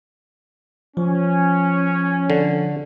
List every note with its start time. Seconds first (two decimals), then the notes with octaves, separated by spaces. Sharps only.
0.97 F3 C#4
2.30 D3